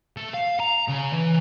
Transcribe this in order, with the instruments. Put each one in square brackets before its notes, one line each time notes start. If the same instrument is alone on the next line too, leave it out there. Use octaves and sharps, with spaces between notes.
[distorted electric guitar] A3
F5
A#5
C#3
E3